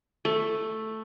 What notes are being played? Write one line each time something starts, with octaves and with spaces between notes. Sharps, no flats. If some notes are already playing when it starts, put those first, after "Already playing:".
A3